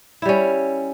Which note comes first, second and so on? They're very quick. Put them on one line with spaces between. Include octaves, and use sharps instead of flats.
E4 G3 C#4